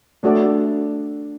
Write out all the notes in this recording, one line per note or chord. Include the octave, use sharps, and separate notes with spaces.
A3 D4 F#4 A4 D5